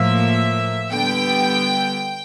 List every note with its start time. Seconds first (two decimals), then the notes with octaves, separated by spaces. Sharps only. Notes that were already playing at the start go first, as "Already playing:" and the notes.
Already playing: A2 F3 A#3 E5
0.92 D3 G3 B3 G5